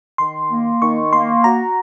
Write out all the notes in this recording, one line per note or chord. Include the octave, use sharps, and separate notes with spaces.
D#3 C6
A#3
D#3 C#6
A#3 C6
F#4 A#5